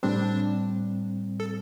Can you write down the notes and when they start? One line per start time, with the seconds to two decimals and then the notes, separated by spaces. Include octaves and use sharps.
0.03 A2 G3 C4 D4
1.40 A4